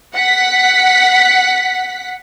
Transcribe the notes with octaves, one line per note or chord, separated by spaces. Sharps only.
F#5 B6